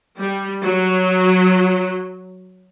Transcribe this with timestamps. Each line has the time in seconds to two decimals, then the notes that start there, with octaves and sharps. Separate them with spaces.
0.18 G3
0.63 F#3